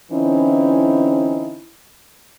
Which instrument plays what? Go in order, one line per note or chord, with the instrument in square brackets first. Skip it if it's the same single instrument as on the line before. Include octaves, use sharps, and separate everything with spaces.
[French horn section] D3 E3 C4 C#4 D#4 E4